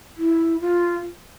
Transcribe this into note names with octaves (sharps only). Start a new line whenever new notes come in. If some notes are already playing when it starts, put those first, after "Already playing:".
E4
F4